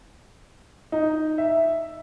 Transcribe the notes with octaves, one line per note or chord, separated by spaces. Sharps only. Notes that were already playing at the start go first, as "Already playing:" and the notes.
D#4
E5